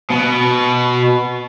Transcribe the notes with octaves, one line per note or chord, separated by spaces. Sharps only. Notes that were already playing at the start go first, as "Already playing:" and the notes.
B2